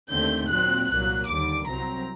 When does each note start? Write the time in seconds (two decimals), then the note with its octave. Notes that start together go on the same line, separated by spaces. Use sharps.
0.10 D#2 D3 A3 C4 G6
0.49 A#2 F#3 C4 F#6
0.89 C2 A#2 F#3 A#3 F#6
1.27 D#2 D3 G3 D6
1.67 C2 C3 F#3 C4 A#5